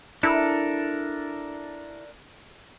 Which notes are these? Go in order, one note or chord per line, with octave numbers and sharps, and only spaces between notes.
D4 E4 A4 A#4